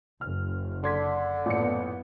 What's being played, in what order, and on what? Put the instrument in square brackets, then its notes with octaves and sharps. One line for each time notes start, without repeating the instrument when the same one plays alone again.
[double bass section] F#1 [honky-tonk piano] F6
[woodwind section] D3 [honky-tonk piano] C6 G#6 B6
[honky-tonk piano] A1 A#2 C#7 [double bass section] F#2 B3